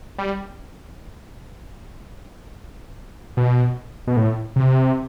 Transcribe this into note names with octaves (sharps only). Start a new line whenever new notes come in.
G3
B2
B2
A2
C3